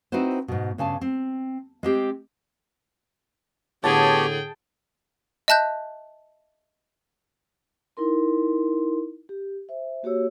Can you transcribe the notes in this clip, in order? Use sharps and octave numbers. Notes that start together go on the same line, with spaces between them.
C4 D#4 E4 F#4 B4 C5
G#2 B2
G2 C#3 G#5 A5
C4
G#3 C4 G4
A2 D3 B3 G4 G#4 C#5 G5 A5
D#5 E5 A5 F#6 G6
D#4 E4 A#4 C6
G4
C5 E5
A#3 F#4 G4 C#5 E6